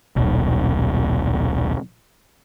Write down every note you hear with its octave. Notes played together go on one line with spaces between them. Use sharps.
D#1 B1